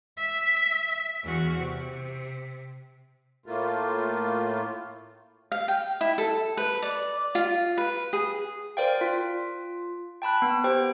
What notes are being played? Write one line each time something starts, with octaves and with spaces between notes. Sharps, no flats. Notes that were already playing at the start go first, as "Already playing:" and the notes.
E5
E2 F#4
C3
A2 A3 A#3 F4
F5
G5
E4
A4
B4
D5
F4
B4
G#4
A#4 C5 D5 F5 G5
F4
G5 A5 B5 F#6
B3
G4 C5 G5